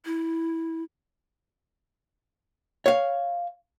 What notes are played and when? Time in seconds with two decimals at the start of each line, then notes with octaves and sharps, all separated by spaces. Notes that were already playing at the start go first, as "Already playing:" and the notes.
0.05 E4
2.86 C#5 F5